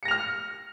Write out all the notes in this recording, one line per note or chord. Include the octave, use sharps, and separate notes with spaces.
F6 A#6 C#7 F7